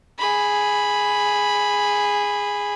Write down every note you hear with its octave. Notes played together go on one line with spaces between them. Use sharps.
G#4 B5